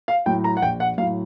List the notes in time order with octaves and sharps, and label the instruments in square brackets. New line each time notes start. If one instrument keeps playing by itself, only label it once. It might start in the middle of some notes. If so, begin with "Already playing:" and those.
[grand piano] F5
A2 F#3 G5
A#5
F#5
A#1 G5
F#5
F#3 F5
A2